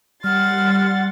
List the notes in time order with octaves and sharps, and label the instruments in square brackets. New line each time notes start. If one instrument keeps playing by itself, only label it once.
[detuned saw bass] G3 [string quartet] F#5 C6 A6 [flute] F6